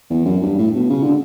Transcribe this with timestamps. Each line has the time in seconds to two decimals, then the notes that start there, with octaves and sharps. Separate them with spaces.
0.10 E2
0.25 F#2
0.43 G2
0.58 A2
0.75 B2
0.90 C#3
1.03 D3